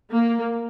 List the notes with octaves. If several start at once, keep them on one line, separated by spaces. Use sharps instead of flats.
A#3